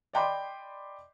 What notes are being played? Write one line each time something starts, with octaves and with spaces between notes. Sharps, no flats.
D5 D#5 G5 B5 C6 D6